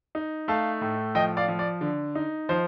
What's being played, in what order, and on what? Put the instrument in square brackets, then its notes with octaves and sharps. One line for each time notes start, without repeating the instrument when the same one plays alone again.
[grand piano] D#4
A3 F5 A5
A2
F3 D#5 G5
D5 F5
F3
D5
D3
D#4
F3 C5